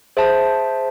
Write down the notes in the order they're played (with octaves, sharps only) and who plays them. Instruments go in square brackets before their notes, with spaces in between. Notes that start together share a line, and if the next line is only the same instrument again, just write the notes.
[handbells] G#4 C5 E5 A5